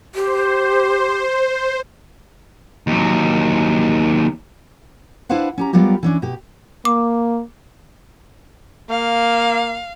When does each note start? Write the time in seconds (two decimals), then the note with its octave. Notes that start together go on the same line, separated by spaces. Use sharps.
0.15 G4 C5
2.87 D#2 F#3
5.29 D4 E4 B4 C5 F5 F#5
5.58 C#4 G4 A#5
5.73 F#3 G3 B3 F4 G4 A#4
6.03 E3 C#4 D4
6.22 B2 G4
6.85 A#3 D6
8.90 A#3 F5